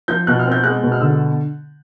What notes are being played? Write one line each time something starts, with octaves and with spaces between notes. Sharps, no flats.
F3 G6
B2 F#6
F6
C4
G6
G#3 F#6
B2
F6
D3 E6